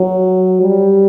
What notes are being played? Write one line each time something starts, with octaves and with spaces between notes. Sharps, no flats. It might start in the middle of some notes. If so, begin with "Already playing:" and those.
Already playing: F#3
G3